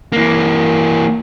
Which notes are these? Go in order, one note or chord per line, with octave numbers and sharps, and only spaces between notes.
E3 A#3